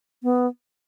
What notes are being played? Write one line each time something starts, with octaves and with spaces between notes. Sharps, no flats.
B3